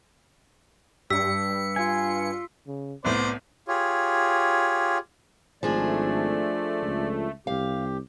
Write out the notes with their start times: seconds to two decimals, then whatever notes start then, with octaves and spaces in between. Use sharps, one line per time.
1.10 G2 G3 E6 B6 C#7
1.76 F4 G#5
2.67 C#3
3.05 C2 A2 B3 C5 D5
3.68 F4 G4 G#4 C#5
5.63 G#1 F3 A3 D4 G#4 D5
6.81 C#2
7.47 C2 G4 F5